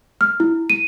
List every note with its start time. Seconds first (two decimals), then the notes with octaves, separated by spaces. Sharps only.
0.21 F6
0.40 E4
0.70 D#7